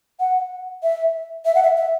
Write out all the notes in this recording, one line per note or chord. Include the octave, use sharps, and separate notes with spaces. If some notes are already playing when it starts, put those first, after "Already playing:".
F#5
E5
E5
F#5
E5
E5